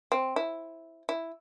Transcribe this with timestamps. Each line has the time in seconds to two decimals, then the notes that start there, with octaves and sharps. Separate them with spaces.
0.12 C4
0.36 E4
1.09 E4